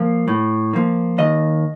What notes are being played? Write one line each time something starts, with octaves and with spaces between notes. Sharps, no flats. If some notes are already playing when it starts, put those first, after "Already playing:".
Already playing: F3 A#3
A2
F3 A#3
D#2 D#5